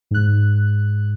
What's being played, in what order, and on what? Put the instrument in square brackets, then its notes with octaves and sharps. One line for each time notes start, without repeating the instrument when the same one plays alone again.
[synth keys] G#2 F#6